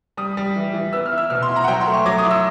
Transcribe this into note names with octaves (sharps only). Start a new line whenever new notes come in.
G3 D#6
G3
E3
E3
B3 E6
F6
E4
E6
B2 F6
C6
E4
A#5
F#5
F#3 G5
C6
A3
C#6
F#3 D6
D#6
E4
E6